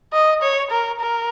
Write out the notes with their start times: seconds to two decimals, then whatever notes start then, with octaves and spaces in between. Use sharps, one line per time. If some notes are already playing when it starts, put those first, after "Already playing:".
0.13 D#5
0.42 C#5
0.71 A#4
1.00 A#4